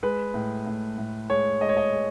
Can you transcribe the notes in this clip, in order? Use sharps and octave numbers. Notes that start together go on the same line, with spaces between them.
G#3 B4
A2
A2
A2
G#3 C#5
G#3 D#5
C#5
D#5
G#3